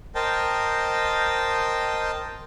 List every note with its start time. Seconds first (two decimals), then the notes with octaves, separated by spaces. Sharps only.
0.15 A#4 C5 D#5 G5 A5